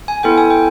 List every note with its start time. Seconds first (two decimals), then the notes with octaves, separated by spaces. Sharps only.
0.08 G#5
0.23 B3 E4 A4 G5
0.38 G#5
0.51 G5